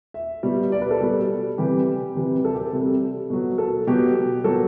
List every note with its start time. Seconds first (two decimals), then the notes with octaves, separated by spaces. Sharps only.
0.14 E5
0.43 B2 G3
0.72 D5
0.81 B4
0.91 A4
1.00 B2 G3
1.58 C3 E3 G3 G4
2.15 C3 E3 G3
2.45 A4
2.55 G4
2.66 A4
2.73 C3 G3
3.30 B2 F#3
3.58 A4
3.87 B2 F#3 G4
4.44 B2 F#3 A4